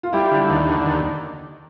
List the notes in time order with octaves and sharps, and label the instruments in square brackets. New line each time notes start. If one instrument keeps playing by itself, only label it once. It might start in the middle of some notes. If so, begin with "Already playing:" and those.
[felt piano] F4
[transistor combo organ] G3 [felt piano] E4
[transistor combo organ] D3
D#2
D3
D#2